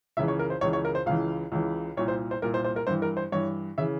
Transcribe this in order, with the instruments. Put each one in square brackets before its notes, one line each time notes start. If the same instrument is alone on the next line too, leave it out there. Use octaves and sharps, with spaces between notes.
[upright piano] C#2 C#3 E3 E5
C#5
A#4
C5
C#2 C#3 E3 C#5
C#5
A#4
C5
C#2 C#3 E3 F5
C#2 C#3 E3
C2 A#2 C#5
C5
C5
C2 A#2 A#4
C5
C5
A#4
G2 E3 C5
A#4
C5
G2 E3 C#5
C#3 E3 E5